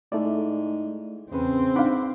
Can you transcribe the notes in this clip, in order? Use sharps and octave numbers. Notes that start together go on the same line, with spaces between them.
G#2 A3 E4 D5
E2 C#3 C4 B4
D4 D#4 F5 F#5 B5 D6